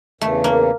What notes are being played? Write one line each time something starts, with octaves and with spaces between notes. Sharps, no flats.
E2 C#3 E3 A3
A#3